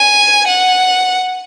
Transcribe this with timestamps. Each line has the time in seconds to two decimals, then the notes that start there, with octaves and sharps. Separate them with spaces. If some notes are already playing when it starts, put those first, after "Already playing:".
Already playing: G#5
0.48 F#5